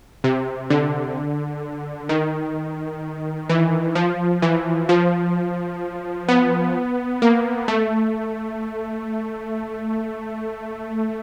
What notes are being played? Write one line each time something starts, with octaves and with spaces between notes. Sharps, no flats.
C3
D3
D#3
E3
F3
E3
F3
B3
A#3
A3